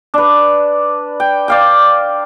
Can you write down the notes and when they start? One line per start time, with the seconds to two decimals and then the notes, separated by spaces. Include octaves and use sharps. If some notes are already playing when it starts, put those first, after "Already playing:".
0.14 D4 B4
1.20 G5
1.48 D5 F5 G5